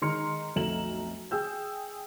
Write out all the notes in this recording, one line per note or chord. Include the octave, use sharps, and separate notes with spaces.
D#3 G#3 A#5 C6 F6 C#7
B1 F2 A3 A#5 E7 F#7
G#4 G5 E6 G6